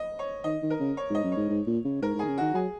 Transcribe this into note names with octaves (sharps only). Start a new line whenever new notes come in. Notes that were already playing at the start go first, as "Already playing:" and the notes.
Already playing: D#5
C#5
D#3 D#5
D#3
A#4
C#3
C#5
G#2
D#5
F#2
C#5
G#2
G#2
A#2
C#3
G#2 A#4
G#2
D#3 G#4
C#3
D#3 F#4
F#3 G#4